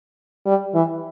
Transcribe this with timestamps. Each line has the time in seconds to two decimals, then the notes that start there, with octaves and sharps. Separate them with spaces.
0.46 G3
0.74 E3